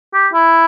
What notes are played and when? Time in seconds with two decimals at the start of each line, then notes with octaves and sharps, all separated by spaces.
0.14 G4
0.33 E4